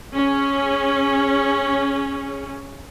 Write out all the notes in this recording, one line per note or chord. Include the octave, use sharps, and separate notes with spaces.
C#4 G#4